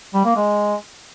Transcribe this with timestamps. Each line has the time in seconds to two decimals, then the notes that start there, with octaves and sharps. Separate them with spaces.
0.14 G3
0.25 A#3
0.36 G#3